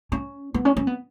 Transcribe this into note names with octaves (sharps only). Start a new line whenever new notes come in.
C#4
B3
C#4
C#4
B3